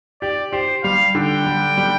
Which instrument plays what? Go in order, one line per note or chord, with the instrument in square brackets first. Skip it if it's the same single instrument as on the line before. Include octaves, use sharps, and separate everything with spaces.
[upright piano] G4 [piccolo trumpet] D5
[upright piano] G4 [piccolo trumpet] C5
[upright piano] G3 [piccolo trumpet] F5
[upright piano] D3 [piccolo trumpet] G5
[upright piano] G3
G3